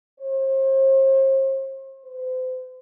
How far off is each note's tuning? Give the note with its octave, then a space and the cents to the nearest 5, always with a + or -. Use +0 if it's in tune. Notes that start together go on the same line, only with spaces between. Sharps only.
C5 +40
C5 -35